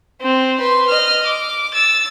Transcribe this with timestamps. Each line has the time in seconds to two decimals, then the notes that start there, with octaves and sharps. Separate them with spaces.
0.22 C4
0.58 B4 C6
0.89 D#5 F6
1.26 D6
1.74 E6 A6